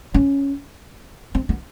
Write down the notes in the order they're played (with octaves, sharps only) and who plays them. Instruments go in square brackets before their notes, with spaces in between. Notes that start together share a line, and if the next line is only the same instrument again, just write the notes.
[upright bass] C#4
C4
B3